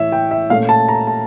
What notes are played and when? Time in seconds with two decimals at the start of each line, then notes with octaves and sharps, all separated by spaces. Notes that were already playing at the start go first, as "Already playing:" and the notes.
Already playing: A2 E3 C#5 E5
0.12 G5
0.31 E5
0.50 A#2 A3 C#4 F5
0.69 A5
0.88 A#5
1.07 A5